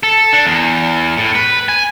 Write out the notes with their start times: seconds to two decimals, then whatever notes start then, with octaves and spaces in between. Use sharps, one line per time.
0.03 A4
0.33 D4
0.45 E2
1.18 A2
1.35 B4
1.69 G#5